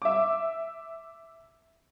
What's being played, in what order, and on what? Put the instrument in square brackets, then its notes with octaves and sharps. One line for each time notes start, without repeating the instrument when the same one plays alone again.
[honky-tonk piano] E5 D6